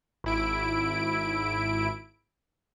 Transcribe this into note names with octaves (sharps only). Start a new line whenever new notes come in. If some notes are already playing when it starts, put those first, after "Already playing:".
G#1 E4 D7